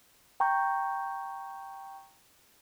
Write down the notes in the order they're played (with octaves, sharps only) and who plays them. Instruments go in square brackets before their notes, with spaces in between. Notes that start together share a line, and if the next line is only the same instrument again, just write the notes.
[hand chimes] G5 A#5 C#6 G6